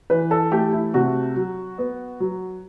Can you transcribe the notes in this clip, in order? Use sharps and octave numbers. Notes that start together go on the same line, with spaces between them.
E3 B4
A4
A3 G4
E4
C3 F#4
F#3
B3
F#3